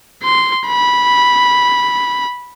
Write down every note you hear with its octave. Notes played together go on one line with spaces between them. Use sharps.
C6
B5